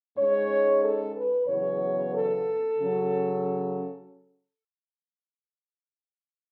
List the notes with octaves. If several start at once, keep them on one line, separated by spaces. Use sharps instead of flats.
G#2 G#3 C#4 C#5
A4
B4
E2 C#3 F#3 B3 C#5
A4
C#3 F#3 C#4